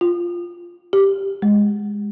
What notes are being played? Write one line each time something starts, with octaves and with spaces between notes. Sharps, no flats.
F4
G4
G#3